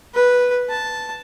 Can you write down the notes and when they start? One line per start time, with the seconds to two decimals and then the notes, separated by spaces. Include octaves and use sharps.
0.14 B4
0.70 A5